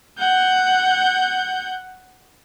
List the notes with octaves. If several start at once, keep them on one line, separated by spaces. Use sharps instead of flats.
F#5 G6